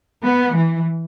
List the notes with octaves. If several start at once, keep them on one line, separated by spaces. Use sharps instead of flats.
B3
E3